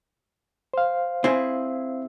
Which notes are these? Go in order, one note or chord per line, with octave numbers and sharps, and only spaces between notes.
C5 F5
C4 E4 G#4